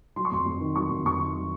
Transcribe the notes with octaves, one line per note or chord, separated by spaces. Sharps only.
F#3 C6
C#6
F2 C6
F2
D#3
F#3 C#6
F2
F2 C#6
D#3
F#3